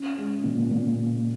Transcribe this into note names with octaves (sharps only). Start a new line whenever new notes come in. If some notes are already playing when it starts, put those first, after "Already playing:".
Already playing: C#4
G#3
A#2
A#2